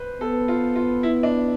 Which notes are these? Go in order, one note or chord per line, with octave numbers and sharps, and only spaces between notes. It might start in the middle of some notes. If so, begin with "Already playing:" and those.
Already playing: B4 C5
B3 A4
F4
F4
E4
D4